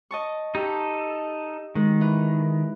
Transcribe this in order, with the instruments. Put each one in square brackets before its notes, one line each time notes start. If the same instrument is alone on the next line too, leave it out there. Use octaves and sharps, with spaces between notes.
[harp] D#5 A5 C#6
[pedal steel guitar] D#4 A4 [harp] G4
[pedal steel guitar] D#3 [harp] G#3
[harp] E3